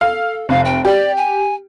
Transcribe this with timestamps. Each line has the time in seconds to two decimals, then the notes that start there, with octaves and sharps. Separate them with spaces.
0.01 A4 F5
0.49 F1 F5
0.65 G5
0.85 G4 D5
1.17 G#5